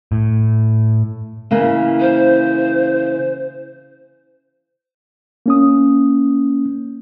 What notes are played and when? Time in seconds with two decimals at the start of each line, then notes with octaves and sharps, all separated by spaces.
0.12 A2
1.51 C#3 E3 A#3
2.00 C5
5.46 A#3 C#4 D#6